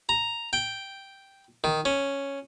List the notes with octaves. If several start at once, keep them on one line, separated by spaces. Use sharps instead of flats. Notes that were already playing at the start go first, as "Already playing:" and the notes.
A#5
G5
D#3
C#4